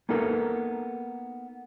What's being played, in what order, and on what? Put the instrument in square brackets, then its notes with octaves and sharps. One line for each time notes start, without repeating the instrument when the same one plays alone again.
[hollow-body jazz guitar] A#3 B3 D#4 A4 A#4